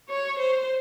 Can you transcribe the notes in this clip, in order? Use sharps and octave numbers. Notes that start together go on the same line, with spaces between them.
C#5
C5